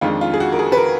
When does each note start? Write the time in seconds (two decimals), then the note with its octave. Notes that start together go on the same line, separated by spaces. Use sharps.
0.01 F2 D#3 G#3 D4 F4
0.21 F4
0.34 G#4
0.40 F#4
0.53 A#4
0.59 G#4
0.72 B4
0.77 A#4